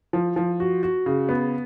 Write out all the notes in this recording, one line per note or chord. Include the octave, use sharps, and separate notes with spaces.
F3
F3
F#4
F#4
C#3
B3